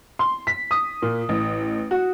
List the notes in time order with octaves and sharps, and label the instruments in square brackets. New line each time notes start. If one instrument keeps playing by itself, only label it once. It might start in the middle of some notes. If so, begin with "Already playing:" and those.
[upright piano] C6
B6
D#6
A#2
A1
F#4